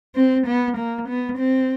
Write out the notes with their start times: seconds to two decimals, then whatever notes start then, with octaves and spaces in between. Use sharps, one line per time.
0.15 C4
0.47 B3
0.78 A#3
1.08 B3
1.38 C4